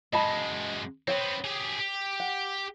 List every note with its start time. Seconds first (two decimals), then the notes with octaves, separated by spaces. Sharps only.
0.13 F#2 G#3 D#5 A5 B5
1.08 B3 C4 C#5 G5
1.44 G4 G#4
1.79 G4
2.20 F#5